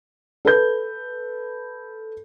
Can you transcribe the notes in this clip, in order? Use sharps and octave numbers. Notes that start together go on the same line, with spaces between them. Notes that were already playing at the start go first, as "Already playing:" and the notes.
A4 B4 G6